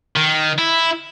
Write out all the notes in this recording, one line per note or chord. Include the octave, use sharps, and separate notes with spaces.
D#3
E4